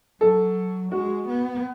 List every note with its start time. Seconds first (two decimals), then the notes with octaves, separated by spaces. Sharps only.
0.21 F#3 A4
0.92 G#3 F#4
1.27 B3